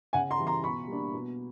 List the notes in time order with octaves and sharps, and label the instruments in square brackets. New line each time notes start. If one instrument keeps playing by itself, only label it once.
[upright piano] C#3 F#5 G#5
A#5 C6
E3 G3
A#5 C6
B2 B5 C#6
G3 A#3 D4
B2